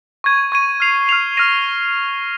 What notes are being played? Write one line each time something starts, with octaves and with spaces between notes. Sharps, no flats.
C#6 G#6 D#7
C#6 G#6 D#7
F6 C7 F7
F6 C7 F7
F6 A#6 D#7